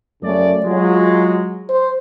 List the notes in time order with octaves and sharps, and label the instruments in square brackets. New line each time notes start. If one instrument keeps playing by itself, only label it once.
[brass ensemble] F#2 C#3 D5 [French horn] A3
[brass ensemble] F#3 G#3 [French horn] F4
[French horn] C5